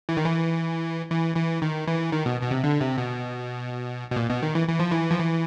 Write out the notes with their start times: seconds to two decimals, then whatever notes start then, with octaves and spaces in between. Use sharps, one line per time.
0.09 E3
0.17 D#3
0.25 E3
1.11 E3
1.36 E3
1.62 D#3
1.87 E3
2.12 D#3
2.26 B2
2.41 B2
2.51 C3
2.64 D3
2.81 C3
2.98 B2
4.11 B2
4.16 A#2
4.30 B2
4.43 D#3
4.55 E3
4.68 E3
4.79 F3
4.92 E3
5.11 F3
5.19 E3